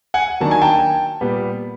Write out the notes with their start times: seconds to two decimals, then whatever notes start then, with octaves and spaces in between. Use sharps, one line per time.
0.14 F#5 G#5
0.40 D#3 F#3 A#3 D4 A5
0.51 G#5
0.62 G5 A5
1.21 A#2 G3 B3